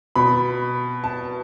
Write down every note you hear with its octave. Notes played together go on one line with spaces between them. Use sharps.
B2 B5
A5